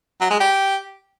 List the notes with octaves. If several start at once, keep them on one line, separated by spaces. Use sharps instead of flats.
F#3
G#3
G4